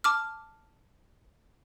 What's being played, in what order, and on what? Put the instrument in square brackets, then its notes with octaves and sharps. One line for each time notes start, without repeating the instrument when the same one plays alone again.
[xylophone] A5 D6 F6